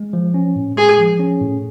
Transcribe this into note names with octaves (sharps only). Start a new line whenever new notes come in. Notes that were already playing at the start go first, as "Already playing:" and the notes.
Already playing: G#3
F3
C#4
A2
G#3 G#4
F3
C#4
A2